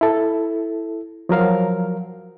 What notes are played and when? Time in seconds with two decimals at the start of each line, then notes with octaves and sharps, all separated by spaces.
0.01 E4 A4
1.29 F3 F#3 A#4 F5